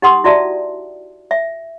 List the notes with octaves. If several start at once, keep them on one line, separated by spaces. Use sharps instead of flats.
D#4 G4 F#5 C6 D#6
E4 F#4 D5 E5 A5
E5